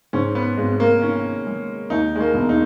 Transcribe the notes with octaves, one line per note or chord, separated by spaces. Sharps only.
G#2 C#4
B3
G#1 G#3
A#3
D#3 C#4
G#3
D#2 D#4
G#3
A#3
E1
D#4